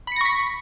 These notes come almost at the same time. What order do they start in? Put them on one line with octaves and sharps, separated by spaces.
B5 C#7 A#6 C#6 B6